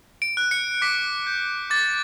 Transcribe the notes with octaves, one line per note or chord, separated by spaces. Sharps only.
D7
F#6
C#7
D6 B6
G6
D6 A6